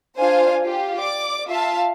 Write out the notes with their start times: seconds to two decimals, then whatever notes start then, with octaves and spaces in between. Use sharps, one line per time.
0.17 D4 F4 C5 F5 G#5
0.62 F4 G4
0.98 D5 D6
1.47 F4 E5 F5 A5